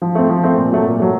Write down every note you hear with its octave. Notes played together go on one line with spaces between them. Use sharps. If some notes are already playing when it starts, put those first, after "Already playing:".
F3
A3 C4
F3
A3 C4
A#2
F#3 A3
A#2
F#3 A3